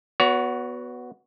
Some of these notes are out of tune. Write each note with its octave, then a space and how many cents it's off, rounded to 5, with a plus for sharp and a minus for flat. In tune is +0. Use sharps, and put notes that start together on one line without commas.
B3 +0 F#4 +0 C#5 +40